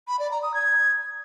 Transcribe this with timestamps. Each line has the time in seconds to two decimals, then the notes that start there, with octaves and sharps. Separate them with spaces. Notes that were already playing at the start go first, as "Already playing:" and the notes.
0.08 B5
0.19 D5
0.31 A#5
0.43 D#6
0.54 G#6